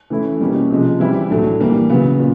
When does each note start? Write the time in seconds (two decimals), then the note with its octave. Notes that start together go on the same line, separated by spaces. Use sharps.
0.10 E3 A3 C#4 E4
0.40 B2 G3 A#3 C#4
0.70 C3 F3 G#3
1.00 E3 G3 C4 E4
1.30 A2 F#3 A3 D4
1.60 E3 G3 A#3
1.90 C#3 F#3 B3
2.19 A#2